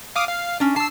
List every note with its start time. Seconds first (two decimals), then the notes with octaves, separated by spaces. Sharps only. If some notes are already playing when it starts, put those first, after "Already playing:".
0.16 F5 D6 D#6
0.29 F5
0.60 C#4 D4
0.76 A5 E6 C7